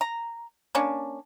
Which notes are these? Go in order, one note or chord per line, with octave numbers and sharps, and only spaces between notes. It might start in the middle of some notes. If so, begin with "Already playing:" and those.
A#5
A#3 C#4 D4